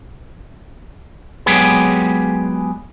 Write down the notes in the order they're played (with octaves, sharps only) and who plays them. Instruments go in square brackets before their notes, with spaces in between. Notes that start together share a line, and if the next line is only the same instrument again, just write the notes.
[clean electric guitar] F#3 G#3 B3 G4 G#4 B4